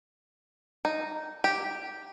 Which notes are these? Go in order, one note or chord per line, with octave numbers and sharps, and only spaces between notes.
D#4
G4